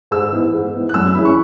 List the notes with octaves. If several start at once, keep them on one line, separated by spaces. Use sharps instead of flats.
G#2 E6
E3 B3
G#2
E3 B3
F#6
F#2 E6
E3 G#3 C#4 E4 B5
C#6